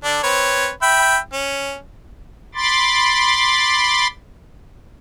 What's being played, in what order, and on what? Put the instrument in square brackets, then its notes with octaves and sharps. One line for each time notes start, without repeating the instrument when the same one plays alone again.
[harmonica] D3 D4
C4 B4 C#5
E5 G5 B5
C#4
[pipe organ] B5 C6 D6 A6